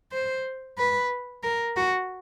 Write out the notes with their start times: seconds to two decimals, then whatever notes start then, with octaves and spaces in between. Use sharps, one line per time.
0.12 C5
0.78 B4
1.43 A#4
1.77 F#4